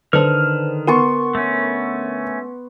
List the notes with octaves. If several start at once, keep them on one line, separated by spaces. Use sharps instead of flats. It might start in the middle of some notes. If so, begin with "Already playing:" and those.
D3 D#3 B4 C5 A5 F6
B3 A#4 C6 C#6 A6
A3 C#4